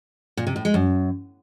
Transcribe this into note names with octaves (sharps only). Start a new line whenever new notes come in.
A#2
C3
A2
G#3
F#2